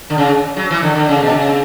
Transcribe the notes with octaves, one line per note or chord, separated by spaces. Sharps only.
D3
C#3
F#3
E3
D3
D3
C#3
B2
C#3